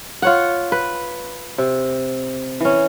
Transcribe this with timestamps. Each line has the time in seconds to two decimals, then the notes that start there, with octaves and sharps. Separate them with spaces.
0.22 F4 C#5 F#5
0.72 B4
1.58 C3
2.61 E3 C#4